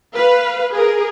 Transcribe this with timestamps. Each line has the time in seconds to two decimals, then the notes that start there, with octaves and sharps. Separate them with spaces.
0.15 B4 F5
0.74 G#4 A#4